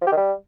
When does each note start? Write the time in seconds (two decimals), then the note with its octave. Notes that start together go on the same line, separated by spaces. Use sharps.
0.01 F3
0.07 G4
0.12 D#3
0.17 G3